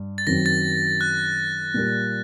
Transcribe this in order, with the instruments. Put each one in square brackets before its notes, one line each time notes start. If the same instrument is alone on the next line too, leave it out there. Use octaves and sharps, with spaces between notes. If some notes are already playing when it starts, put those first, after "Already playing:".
Already playing: [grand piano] G2
[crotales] A6
[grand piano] F#2 D#3 F#3 C4 [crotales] A#6
[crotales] A6
F#6
[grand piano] A#2 G3 A#3